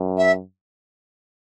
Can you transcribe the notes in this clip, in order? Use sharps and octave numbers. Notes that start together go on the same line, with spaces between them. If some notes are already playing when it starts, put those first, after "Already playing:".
Already playing: F#2
E5